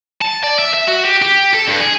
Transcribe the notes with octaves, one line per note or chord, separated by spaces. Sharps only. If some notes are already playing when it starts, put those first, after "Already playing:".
A5
D5
E5
E5
F#4
G4
G4
A4
G2
G#4